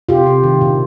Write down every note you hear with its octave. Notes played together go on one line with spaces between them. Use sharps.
C3 F4 G4
C3
D#3
A#2